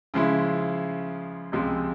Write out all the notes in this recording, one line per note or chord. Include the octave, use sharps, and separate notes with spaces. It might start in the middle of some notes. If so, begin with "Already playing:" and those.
C#3 F3 G#3 E4
C#2 C3 F3 G#3 C4